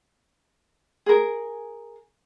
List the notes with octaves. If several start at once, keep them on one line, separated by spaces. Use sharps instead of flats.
G#4 A#4